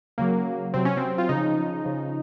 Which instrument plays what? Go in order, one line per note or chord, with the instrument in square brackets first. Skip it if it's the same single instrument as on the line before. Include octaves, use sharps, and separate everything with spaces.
[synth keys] C#3 F#3 A#3
C3 F#3 C4
C#4
C4
F4
C#3 F3 D#4
C#3 F3